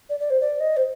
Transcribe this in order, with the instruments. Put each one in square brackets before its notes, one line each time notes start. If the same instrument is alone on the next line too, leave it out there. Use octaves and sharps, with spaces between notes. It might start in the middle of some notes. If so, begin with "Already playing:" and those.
[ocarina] D5
D5
C5
D5
D#5
C5